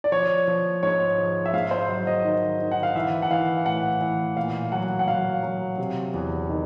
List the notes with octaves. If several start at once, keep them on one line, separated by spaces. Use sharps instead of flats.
D5
F3 C#5
F3
G#2 C#5
F3
E5
G#2 F5
C5
F#3
D#5
D#3
D#3
F#5
F5
E3 E5
F#5
E3 F5
A2 F#5
E3
A#2 F5
F#3 F#5
F#5
F#3 F5
F#3
C3
E2
D#3